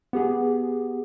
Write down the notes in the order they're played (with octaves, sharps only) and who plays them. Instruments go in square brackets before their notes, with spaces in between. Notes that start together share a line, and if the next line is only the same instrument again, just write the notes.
[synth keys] B3 G4 G#4